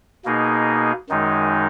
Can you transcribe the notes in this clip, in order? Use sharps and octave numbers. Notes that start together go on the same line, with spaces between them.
B2 A#3 D#4 G#4
F#2 D#3 G#3 D#4